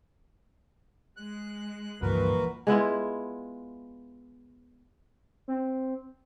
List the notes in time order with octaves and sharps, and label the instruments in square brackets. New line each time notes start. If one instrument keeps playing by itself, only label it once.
[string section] G#3 [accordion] F#6
[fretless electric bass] C#2 G2 [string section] A#2 [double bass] E3 F3 [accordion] F#4 A#4 B4
[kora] G#3 B3 E4 F4
[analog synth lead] C4